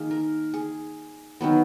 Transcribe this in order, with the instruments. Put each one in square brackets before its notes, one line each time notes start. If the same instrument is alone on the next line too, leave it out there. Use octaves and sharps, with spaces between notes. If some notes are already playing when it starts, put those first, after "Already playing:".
Already playing: [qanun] D#3 A#3 G#4
A#4
G#4
D#3 F#3 B3